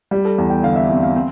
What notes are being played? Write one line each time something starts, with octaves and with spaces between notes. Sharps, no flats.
G3 G4
A4
E2
G5
D3 F5
E5
C4 E5
F5
C4